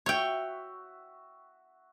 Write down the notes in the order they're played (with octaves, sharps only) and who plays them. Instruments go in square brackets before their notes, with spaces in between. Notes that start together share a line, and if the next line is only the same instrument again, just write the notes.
[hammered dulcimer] F#4 E5 [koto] C#5 G5